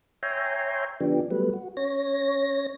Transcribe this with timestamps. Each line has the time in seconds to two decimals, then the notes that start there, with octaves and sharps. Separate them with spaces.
0.23 C#5 E5 G5 G#5 A#5 C6
1.00 D3 F3 B3 D4 G4
1.31 F#3 G3 A3 B3 B4
1.53 F#4
1.77 C#4 C#5 A#6